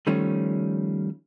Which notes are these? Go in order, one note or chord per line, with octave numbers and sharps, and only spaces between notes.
D#3 F3 G3 A3 C#4